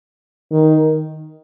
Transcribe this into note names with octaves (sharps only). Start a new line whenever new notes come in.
D#3